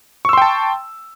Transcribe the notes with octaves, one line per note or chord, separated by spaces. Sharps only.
G5 A5 C6 C#6 E6